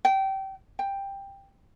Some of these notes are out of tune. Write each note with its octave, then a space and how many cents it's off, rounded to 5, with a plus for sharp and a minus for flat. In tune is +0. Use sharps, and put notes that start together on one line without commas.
G5 -25
G5 +10